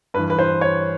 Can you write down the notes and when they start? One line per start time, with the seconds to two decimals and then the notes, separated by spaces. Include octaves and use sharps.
0.14 G2 B4
0.19 E3
0.30 B4
0.39 C5
0.61 C#5